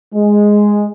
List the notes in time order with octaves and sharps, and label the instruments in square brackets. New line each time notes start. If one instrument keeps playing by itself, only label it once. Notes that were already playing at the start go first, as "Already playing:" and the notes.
[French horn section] G#3